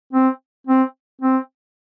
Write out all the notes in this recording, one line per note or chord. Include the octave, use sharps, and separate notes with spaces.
C4
C4
C4